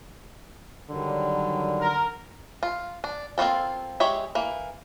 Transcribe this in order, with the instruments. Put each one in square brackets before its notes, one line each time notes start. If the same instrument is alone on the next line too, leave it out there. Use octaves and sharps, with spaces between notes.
[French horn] D3 [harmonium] D#3 F#3 G3
[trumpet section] A#4
[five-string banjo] F4
D4
A#3 C4 C#4 F4 A4
G#3 G4 C#5 E5
E3 A#3